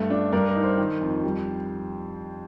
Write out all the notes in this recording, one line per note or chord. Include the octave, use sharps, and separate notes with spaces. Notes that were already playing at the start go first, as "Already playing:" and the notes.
Already playing: G2 A3
D4
G2 A#4 D5
A#4
D#4
C5
D#3
F2
G3